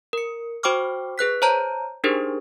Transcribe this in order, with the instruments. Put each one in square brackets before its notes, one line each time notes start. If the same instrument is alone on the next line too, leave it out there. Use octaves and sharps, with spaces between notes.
[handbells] A#4 C#7
F#4 C5 G5 C#6 D6 F6
G#4 B4 F#6 B6
C5 C#5 A5 A#5 G6
D4 D#4 G4 G#4 A#4 C5